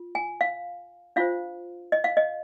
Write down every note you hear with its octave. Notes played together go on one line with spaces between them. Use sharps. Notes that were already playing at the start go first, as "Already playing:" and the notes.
Already playing: F4
G#5
F5
D4 F4 C5 F5
D#5
F5
D#5